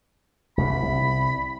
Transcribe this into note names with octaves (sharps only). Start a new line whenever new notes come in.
C2 A#2 B5
C2